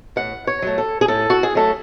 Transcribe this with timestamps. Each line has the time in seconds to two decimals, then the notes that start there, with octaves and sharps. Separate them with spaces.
0.16 A2 F#5
0.47 C#5
0.62 F#3 A3
0.78 A4
1.01 G#4
1.08 A2 A4
1.30 F#4
1.43 G#4
1.55 F#3 A3 A4